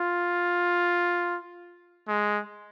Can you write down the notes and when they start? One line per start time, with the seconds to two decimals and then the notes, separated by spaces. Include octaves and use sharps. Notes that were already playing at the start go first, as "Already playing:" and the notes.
Already playing: F4
2.08 G#3